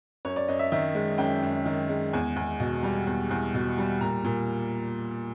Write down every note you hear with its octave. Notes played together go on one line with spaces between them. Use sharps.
F#2 C#5
D5
F#2 D#5
E5
D#3 E5
G#3
F#2 G5
F#2
D#3
G#3
E2 G#5
E2
B2
G3
E2
E2
B2
G3
A#2 A#5
A#2